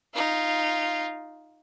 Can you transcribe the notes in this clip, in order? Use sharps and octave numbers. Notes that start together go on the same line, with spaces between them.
D#4 F4